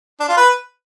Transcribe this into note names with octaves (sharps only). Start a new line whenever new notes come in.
D4
F4
B4